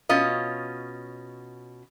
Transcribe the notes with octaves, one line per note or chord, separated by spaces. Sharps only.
B2 C#4 F4 D#5